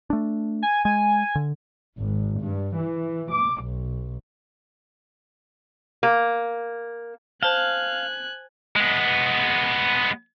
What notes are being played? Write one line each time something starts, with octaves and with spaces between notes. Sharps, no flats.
A3 D4
G#5
G#3 G#5
D3
G#1
G2
E3
D6
B1
A#3
C5 F5 G#5 A5 F#6 G7
G#3 B3